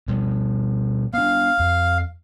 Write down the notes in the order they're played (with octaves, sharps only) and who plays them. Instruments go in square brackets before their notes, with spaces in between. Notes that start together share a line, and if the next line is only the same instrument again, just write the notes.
[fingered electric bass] B2 G3
[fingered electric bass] B3 D4 [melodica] F5
[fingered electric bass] F2